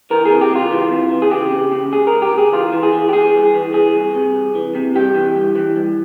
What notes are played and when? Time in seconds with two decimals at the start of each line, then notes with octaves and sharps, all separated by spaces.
0.10 E3 A#4
0.25 C3 G#4
0.41 G4
0.51 C#2 F4
0.71 E3
0.91 C3
1.11 E3
1.22 G#4
1.31 C#3 G4
1.52 C#3
1.71 C#3
1.92 C#2 G#4
2.07 A#4
2.12 C#2
2.22 G4
2.32 C#2
2.38 G#4
2.52 E3 F4
2.72 E3
2.83 G#4
2.92 E3
3.09 G4
3.13 E3 G#4
3.33 G2
3.54 E3
3.73 E3 G#4
3.93 C2
4.15 C3
4.35 C2
4.55 E3
4.75 C3
4.95 G2 G4
5.15 E3
5.36 G2
5.55 E3
5.76 G2